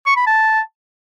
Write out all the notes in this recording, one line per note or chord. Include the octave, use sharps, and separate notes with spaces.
C#6
B5
A5